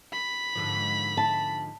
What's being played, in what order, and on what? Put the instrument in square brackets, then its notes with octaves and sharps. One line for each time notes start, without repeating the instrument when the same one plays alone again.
[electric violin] B5
[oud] G#2 D3 F3
[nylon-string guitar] A5